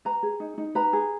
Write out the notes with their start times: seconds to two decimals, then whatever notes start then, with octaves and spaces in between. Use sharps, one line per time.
0.05 B4 A#5
0.23 G#4
0.40 D#4
0.58 D#4
0.75 B4 A#5
0.93 G#4